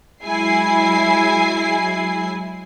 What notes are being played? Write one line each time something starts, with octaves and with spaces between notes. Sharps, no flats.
F#3 G#3 E4 G#5 C7